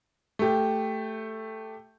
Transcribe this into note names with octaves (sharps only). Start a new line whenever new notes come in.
A3 G4